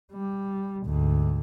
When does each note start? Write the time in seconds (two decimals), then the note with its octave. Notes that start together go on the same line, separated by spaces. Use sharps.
0.13 G3
0.85 D2 G#2